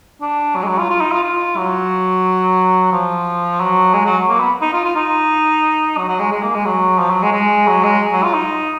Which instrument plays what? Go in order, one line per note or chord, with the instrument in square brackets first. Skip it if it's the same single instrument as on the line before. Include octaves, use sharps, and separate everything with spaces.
[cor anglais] D4
F#3
G#3
F#3
F4
F4
D#4
F4
F4
F#3
F3
F#3
G#3
F#3
A#3
B3
D#4
F4
F4
D#4
F#3
F#3
G#3
G#3
A#3
G#3
F#3
F3
F#3
G#3
G#3
F#3
G#3
F#3
F4
D#4